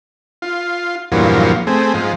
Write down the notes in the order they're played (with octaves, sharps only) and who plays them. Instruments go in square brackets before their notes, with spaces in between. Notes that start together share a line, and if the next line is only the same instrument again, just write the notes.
[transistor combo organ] F4
E2 G2 A#2 F3 F#3
A3 C4 G#4
G#2 F3